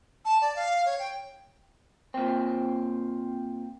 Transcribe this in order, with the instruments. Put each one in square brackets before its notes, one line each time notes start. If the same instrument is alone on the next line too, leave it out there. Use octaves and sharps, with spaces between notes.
[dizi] A5
D5
F5
C#5
G5
[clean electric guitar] A#2 C4